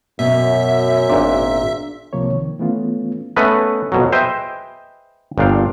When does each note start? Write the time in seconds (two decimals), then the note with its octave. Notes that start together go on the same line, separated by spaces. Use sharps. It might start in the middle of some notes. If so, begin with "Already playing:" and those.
0.19 F#2 B2 E5
1.10 G#1 A#2 D4
2.13 C2 C3 F3 A#3 C#5
2.31 D#3
2.59 E3 A3 B3 C#4 F4
3.36 A3 B3 C#4 B4 D#5
3.92 F2 B2 F#3
4.12 G#4 B4 C5 D#5 E5 G5
5.38 G1 A#2 D4 F5 G5